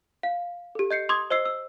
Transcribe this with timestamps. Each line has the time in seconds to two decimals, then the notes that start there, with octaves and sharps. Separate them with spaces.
0.23 F5
0.75 G4 A4
0.91 D#5 G6 C7 C#7
1.09 C6 D6 D#6 G#6
1.30 C5 D#5 E6 C7
1.45 E6